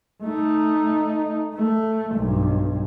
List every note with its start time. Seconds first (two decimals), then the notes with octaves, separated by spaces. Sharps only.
0.24 A3 D#4
1.55 A3
2.15 B1 G2